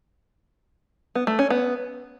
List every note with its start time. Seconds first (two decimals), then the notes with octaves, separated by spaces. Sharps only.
1.15 B3
1.27 A3
1.39 C#4
1.50 B3